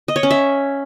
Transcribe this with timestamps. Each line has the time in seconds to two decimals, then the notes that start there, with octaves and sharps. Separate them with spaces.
0.08 D#5
0.16 C#5
0.23 C#4
0.31 E5